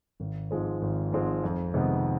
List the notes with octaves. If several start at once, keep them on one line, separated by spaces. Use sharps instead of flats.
G#1
G#2 F3 G#3 C4
G#1
G#2 F3 G#3 C4
F2
C3 D#3 G#3 B3